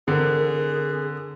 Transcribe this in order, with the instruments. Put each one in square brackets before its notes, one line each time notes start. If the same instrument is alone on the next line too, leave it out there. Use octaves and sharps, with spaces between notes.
[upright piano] D3 [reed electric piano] C4 A#4 [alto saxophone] G#4